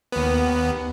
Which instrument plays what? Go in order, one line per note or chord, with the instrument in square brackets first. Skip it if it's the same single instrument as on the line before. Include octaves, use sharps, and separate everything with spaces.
[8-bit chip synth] D#2 B3